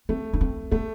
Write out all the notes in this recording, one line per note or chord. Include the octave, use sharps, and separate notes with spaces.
A3 C4
D4
C4
A3 B3